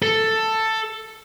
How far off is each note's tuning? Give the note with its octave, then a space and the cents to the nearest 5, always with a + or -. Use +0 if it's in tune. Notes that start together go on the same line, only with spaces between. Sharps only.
A4 +10